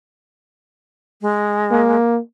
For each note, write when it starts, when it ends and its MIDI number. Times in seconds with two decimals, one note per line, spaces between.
1.22 1.97 56
1.71 2.19 58